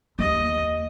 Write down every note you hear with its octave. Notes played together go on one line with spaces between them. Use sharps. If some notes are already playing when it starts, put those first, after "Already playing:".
D#2 D#5